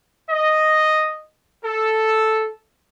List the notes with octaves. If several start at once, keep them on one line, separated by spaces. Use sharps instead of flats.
D#5
A4